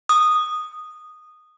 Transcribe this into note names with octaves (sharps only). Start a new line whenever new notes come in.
D#6